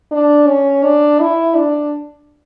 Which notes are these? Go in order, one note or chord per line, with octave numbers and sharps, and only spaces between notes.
D4
C#4
D4
E4
D4